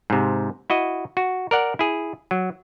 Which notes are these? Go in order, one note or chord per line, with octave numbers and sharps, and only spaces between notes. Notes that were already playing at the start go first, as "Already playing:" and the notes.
G#2 C3
E4 F#4 D#5
F#4
A#4 D5 F#5
E4 G#4
F#3